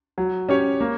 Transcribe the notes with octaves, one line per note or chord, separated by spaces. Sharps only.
F#3
C#4 G4 C#5
A#3